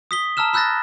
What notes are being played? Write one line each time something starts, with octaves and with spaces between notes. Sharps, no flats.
D#6 B6 G7
A5 A#5 E6 F6 E7
B5 E6 F#6 G6 A6 A#6